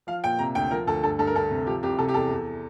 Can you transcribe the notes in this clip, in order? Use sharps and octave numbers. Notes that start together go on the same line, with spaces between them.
F3 F5
A#2 G5
C3 A#5
D2 G5
F3 A#4
D2 A4
G2 A4
G2 A4
A#4
D2 A4
C3
F3 G4
C2 G4
C3 A4
G4
E2 A4
E2